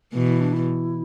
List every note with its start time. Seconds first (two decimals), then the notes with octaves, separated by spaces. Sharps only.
0.14 B2 E3
0.27 E4
0.40 D4
0.53 E4